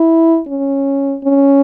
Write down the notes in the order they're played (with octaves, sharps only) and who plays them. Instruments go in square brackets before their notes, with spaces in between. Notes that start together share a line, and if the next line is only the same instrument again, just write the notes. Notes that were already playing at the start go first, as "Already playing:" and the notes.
Already playing: [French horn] E4
C#4
C#4